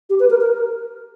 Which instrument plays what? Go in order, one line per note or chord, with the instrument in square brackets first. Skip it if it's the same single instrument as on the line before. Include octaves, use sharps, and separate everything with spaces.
[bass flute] G4
B4
A#4
A#4